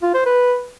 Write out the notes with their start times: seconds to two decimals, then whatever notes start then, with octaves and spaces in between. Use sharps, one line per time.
0.02 F4
0.14 C5
0.26 B4